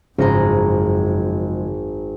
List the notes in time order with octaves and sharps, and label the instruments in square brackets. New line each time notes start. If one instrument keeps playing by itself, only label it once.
[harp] G#1 A#5 [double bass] F#2 [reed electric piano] C#3 [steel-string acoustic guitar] F3 G#3